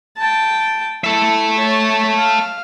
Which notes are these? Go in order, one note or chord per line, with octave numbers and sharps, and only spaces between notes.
G5 A5
E4 A4 E5
C#5 A5
F5